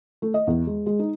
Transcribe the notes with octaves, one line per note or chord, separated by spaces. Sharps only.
A3
D#5
E2
G#3
G#3
D#4